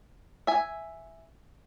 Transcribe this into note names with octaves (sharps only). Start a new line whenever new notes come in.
E5 G#5